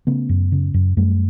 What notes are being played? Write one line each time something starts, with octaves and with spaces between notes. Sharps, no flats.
C#3 A3 B3
F#2
C#3
F#2
F#2 G3 A3